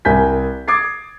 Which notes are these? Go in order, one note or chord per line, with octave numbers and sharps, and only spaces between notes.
C2 A#4 G#5 G6 B6
D6 D#6 G#6 A6 C7